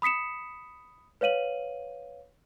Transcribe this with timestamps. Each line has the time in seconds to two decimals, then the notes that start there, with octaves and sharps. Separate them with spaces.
0.02 B5 D#6 B6 C#7 E7
1.21 B4 C#5 F5 D#7 F#7